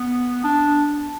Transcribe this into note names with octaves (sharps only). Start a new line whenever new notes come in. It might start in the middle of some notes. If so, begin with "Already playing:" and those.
Already playing: B3
D4